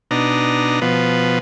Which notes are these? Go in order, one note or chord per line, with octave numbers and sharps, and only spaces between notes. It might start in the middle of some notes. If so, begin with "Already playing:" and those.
B2 D4 D#4 A#5
B2 F3 B3